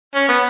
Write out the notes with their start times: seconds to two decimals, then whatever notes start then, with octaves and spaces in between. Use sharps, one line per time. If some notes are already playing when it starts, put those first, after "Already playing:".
0.15 C#4
0.29 B3